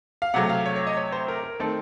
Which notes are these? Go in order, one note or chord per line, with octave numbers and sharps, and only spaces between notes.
F5
C3 F#3 A3 F#5
F5
C#5
C#5
D#5
C#5
C5
A#4
A#4
D#3 A3 C4 D#4 A4